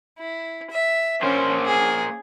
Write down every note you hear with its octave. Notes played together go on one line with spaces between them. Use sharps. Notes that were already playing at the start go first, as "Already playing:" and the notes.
E4
E5
A#3 C#4 C5
G#4